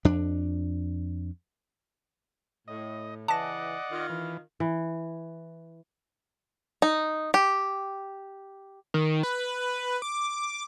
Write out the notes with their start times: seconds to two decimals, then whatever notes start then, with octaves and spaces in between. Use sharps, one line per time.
0.05 F2 D4
2.68 A2 D#5
3.28 C#3 E3 D5 D#5 F#5 A5 A#6
3.91 D#3 F4
4.09 E3
4.60 E3
6.82 D#4
7.34 G4
8.94 D#3
9.23 B4
10.02 D6